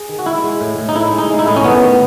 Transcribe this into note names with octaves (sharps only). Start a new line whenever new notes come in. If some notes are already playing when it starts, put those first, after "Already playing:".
Already playing: G#4
D#3
F#4
G#3 E4
G#3
A2
A2
D#4
A2 E4
G#3
D#4
G#3
E4
A2 D#4
C#4
D#3 B3
D#3